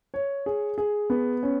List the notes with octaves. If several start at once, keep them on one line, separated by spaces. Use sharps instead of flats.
C#5
G#4
G#4
B3
C#4